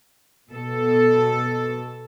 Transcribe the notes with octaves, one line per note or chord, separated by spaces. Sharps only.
B2 A4